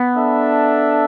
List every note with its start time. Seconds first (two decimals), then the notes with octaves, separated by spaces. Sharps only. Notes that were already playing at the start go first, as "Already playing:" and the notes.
Already playing: B3
0.15 D4 A4 E5